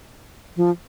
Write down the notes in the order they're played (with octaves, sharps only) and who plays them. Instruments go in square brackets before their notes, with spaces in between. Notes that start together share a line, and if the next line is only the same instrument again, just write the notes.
[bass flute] F3